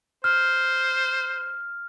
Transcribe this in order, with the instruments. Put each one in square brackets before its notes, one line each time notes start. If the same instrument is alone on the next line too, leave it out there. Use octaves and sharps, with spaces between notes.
[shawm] C5 [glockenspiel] F6